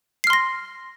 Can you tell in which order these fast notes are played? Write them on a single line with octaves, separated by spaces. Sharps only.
C7 F6 C6 A#6